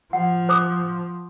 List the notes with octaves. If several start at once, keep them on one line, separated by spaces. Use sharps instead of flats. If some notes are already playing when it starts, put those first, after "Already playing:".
F3 F#5
C5 D6 D#6